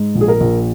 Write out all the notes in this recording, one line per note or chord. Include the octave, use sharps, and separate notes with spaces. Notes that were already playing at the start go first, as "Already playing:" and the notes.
Already playing: G#2
A#1
G#4
A#4
A#1